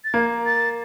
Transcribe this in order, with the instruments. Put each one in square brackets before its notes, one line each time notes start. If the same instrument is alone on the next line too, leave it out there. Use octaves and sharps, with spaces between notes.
[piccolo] A6
[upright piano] A#3 [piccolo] G#6
[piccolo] A6